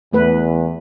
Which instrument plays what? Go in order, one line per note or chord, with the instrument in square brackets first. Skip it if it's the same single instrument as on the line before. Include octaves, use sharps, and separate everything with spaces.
[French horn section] E2 [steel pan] A3 B4